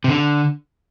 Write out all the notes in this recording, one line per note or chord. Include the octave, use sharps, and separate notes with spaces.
C3
D3